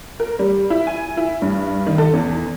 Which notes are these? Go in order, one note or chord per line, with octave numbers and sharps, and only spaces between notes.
A#4
G3
E4
G#5
E4
G2
D#3
A4
E2